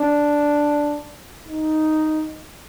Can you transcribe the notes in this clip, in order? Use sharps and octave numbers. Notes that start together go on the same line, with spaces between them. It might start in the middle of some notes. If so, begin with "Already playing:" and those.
Already playing: D4
D#4